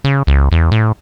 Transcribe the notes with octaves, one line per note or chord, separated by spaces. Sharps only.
C#3
C#2
E2
A2